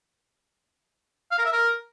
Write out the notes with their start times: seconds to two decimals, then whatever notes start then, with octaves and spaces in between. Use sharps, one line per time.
1.31 F5
1.38 A#4
1.45 E5
1.52 A#4